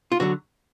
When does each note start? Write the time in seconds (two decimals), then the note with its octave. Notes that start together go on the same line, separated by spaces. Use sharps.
0.12 F4
0.20 D3 F#3 F#4